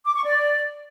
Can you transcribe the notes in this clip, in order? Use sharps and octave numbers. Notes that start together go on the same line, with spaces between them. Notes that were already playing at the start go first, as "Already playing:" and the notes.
D6
C#6
D5